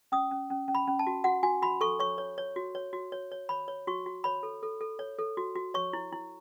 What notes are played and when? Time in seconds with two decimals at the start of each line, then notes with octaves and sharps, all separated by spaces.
0.12 C#4 D#6
0.31 C#4
0.50 C#4
0.68 C#4
0.75 B5
0.88 C#4
0.99 A5
1.07 F#4
1.24 F#4 F#5
1.43 F#4 G#5
1.62 F#4 B5
1.81 A4 C#6
2.00 C#5 C#6
2.18 C#5
2.38 C#5
2.56 F#4
2.75 C#5
2.93 F#4
3.12 C#5
3.32 C#5
3.49 C#5 B5
3.68 C#5
3.87 F#4 C#6
4.06 F#4
4.24 C#5 B5
4.43 A4
4.63 A4
4.81 A4
4.99 C#5
5.19 A4
5.37 F#4
5.55 F#4
5.74 C#5 C#6
5.93 E4
6.13 E4